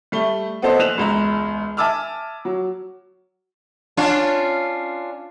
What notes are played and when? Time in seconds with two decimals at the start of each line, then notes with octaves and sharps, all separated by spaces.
0.12 G3 A3 G7
0.62 B3 C4 A4 C5 D5 D#5
0.79 A#1 F#6 E7 F7
0.98 E1 C#2 A#5
1.77 E5 G#5 A5 D6 E6 F6
2.45 F#3
3.97 C#4 D4 F4